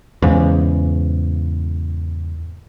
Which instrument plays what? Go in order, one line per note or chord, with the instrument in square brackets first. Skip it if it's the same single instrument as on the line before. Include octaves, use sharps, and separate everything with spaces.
[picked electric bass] E2 G#2 C#3